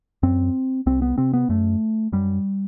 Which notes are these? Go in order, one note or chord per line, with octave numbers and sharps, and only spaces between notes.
F#2 C4
C2 C4
B3
C3 C4
B3
F#2 A3
F#2 G3